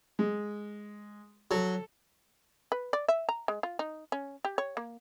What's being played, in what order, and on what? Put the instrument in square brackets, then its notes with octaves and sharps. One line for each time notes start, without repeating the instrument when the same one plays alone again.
[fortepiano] G#3
[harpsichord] F#3 [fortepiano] A4
[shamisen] B4
D5
E5
A#5
G#3
F4
D#4
C#4
G4
C#5
A#3